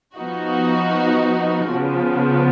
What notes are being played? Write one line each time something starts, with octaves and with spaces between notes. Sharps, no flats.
F3 B3 D#4 F#4
C#3 F3 B3